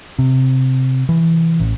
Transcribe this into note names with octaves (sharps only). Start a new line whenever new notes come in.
C3
E3
A1